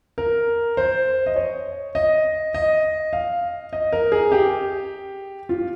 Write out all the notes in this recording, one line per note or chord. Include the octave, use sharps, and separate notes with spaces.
A#4
C5
D#5
C#5
D#5
D#5
F5
D#5
A#4
G#4
G4
F4